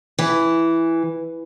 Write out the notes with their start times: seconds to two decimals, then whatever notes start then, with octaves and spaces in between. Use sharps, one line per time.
0.19 E3